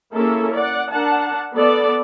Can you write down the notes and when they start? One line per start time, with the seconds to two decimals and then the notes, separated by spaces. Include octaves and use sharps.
0.14 A#3 C#4 E4 G#4 A4
0.54 D5 F#5
0.92 D4 A#4 F#5 A5
1.54 B3 A4 D5